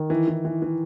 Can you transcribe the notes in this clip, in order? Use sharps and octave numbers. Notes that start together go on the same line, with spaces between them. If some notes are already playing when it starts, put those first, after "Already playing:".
Already playing: D#3
E3
E3
E3
E3